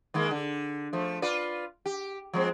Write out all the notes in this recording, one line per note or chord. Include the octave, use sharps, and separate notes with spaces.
D#3 G#3 A#3
D3
F3 A3
F4 B4 D5
G4
F3 G#3 C4